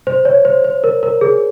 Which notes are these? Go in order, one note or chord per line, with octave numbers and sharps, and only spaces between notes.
C5
C#5
C5
C5
A#4
A#4
G#4